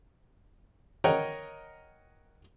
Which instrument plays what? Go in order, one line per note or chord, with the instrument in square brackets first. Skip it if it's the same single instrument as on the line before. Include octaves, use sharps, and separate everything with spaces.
[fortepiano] A#4 C#5 D#5 F#5 G5 A#5